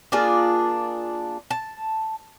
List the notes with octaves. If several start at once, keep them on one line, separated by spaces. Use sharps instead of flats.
A#3 D4 F4 G#4
A5